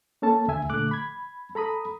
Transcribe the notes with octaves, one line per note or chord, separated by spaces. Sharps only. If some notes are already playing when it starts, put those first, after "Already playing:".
A#3 C#4 A4 A5
D2 E5 G#5
A#2 D3 A3 D6 F#6
B5 G#6
A4 A#5 B5 D#6